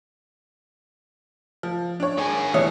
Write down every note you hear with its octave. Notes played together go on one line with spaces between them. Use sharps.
F3
D4 C#5
D#3 G#4
C2 E3 C#5 D#6